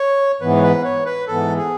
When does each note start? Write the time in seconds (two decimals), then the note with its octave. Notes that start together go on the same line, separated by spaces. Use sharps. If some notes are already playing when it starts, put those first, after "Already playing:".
Already playing: C#5
0.41 G#2 E3 B3 B4
0.56 C#5
0.63 B4
0.84 C#5
1.06 B4
1.27 G#2 E3 B3 A4
1.58 G#4